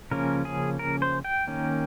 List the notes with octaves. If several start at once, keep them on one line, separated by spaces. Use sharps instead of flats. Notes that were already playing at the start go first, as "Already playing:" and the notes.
C#3 F3 A#3 C#4 A#4
G#4
A#4
C5
G5
D#3 A#3 C#4